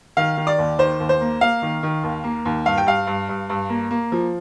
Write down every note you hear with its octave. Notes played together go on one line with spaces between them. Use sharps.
D#3 F5
D#3
D5
D#2
D#3 C5
D#2
C5
A#3
A#3 F5
D#3
D#3
D#2
A#3
D#2
G2 F5
G5
G2 F5
G2
G2
G2
A#3
A#3
F3